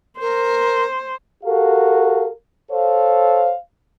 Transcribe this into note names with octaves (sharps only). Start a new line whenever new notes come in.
A#4 C5
F#4 G4 A4 A#4 F5
A4 C5 C#5 F5